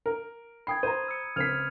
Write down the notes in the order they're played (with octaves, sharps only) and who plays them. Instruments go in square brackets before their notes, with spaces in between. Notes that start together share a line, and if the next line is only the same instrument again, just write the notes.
[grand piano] A#4
[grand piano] G5 C7 [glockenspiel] B5 D#6 G#6
[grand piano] C5 A#5 [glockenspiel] D#7
[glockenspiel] E6 C#7
[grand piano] C#2 C4 B6 [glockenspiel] F6 G#6 F7